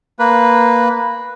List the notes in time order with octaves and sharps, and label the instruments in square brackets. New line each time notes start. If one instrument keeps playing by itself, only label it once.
[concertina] A#3 B4